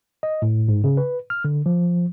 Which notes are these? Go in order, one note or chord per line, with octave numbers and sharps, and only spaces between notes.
D#5
A2
G#2
C#3
B4
F6
D3
F3